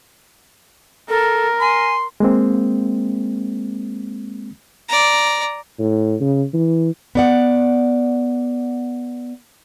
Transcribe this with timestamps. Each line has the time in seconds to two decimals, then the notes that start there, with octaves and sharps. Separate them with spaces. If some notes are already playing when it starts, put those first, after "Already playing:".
1.09 A4 A#4
1.61 G#5 C6
2.20 G#3 A#3 C4
4.88 D5 A#5
5.79 A2
6.20 C#3
6.54 E3
7.15 B3 D5 F#5